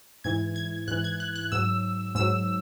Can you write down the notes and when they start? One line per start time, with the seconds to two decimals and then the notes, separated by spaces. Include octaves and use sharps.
0.24 G#2 E3 G#6
0.56 G#6
0.88 G#2 E3 F#6
1.04 G#6
1.20 F#6
1.36 F#6
1.52 G#2 F#3 E6
2.15 G#2 F#3 E6